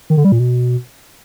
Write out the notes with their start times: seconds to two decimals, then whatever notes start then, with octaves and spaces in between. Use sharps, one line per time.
0.10 D#3
0.17 D3
0.25 G3
0.32 A#2
0.39 B2